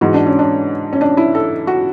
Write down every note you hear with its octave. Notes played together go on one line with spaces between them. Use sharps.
G#2 E3 F#4
D4
C#4
D4
C#4
D4
E4
A4
F#4